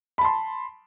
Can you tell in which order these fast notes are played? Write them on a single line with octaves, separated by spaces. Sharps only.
B5 A5 C6